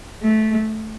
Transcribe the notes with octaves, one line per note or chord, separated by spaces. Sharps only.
A3